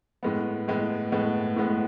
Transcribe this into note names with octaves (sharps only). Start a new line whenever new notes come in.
A2 G#3 B3
A2 G#3 B3
A2 G#3 B3
A2 G#3 B3